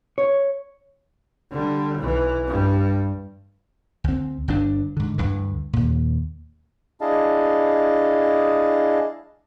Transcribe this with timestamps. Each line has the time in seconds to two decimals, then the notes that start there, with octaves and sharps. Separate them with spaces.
0.18 C#5
1.51 D3 G3
1.99 B1 E3
2.48 G2 G3
4.04 D2 C4
4.48 G1 G2 D4
4.97 G#2 D3
5.18 D2 G2 D3 E3
5.73 D#2 A#2
7.01 D4 E4 G#4 D#5 F5 A5